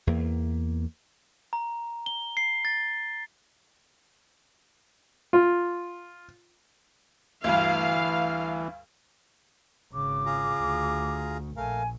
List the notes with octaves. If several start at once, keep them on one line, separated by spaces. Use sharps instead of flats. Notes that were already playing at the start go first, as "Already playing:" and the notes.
E2 A#3
A#5
G7
C7
A6
F4
D2 G2 E3 F5
G#1 C#3 D6
F4 G#4 A#5
D2
A#1 A3 A#4 F5 G#5